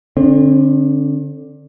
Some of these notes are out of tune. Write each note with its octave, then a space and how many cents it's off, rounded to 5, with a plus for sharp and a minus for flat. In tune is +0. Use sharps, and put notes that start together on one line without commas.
D3 +0 C4 +40